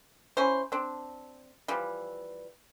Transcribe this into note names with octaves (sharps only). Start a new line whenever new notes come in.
C#4 E4 C5
C4 D4
E3 F3 G3